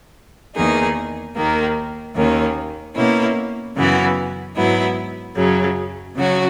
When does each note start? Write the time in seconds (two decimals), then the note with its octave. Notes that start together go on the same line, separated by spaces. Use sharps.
0.55 E2 D#3 A#3 D#4 G#4
1.35 D#2 D#3 A#3
2.15 D#2 D#3 A#3 C#4
2.95 B2 A#3 C#4 E4
3.75 F#2 C#3 E3 B3 F#4
4.55 G#2 F#3 B3 E4
5.35 F#2 C#3 F#3
6.15 C#3 F#3 C#4 F#4